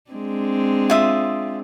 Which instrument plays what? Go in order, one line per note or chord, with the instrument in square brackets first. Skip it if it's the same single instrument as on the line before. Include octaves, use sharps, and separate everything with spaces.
[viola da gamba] G#3 C4 D4
[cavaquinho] F4 E5 D#6